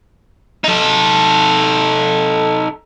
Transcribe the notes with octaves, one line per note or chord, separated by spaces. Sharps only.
D#4 A4